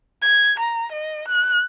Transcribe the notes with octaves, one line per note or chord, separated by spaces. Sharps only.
G#6
A#5
D#5
F#6